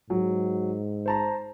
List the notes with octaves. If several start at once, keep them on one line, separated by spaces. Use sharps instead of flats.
G#2 F#3
C5 A5 A#5